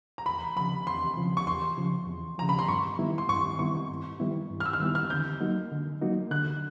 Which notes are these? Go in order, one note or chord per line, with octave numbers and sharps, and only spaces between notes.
A#5
E2 B5
C#3 F3 B5
E2 C6
C#3 F3
C#6
E2 C6
C#3 F3
E2
C#3 F3 A#5
B5
C6
G2 C#6
D#3 G3 B3 E4
C6
G2 C#6
D#3 G3 B3 E4 C#6
G2
D#3 G3 B3 E4
G2
F6
E6
F6
D#3 G3 B3 E4 E6
F6
D3 G6
F#3 A#3 D#4 F#4
D3
F#3 A#3 D#4 F#4
D3 F#6